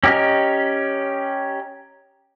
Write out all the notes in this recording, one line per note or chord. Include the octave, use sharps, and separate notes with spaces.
C#4 G4 A#4 D#5 F6